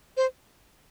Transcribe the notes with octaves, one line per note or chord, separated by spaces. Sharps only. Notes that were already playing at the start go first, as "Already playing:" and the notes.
C5